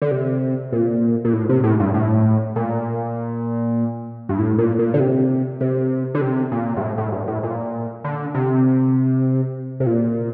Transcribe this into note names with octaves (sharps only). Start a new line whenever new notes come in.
D3
C3
A#2
A#2
A2
C3
A2
G2
A2
A#2
G2
A2
A#2
A#2
D3
C3
C3
D3
C3
A#2
G2
A2
A2
G2
A2
A#2
D3
C3
C3
A#2